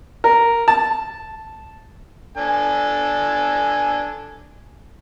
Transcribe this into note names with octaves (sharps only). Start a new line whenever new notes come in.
A#4
A5
D4 A4 G#5